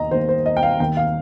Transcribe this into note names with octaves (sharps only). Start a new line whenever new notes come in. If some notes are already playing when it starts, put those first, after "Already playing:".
Already playing: D#2 D#3 D#5 A#5
D#2 D#3 C5
C5
D#5
G5
F5
D#2 D#3 G5
F5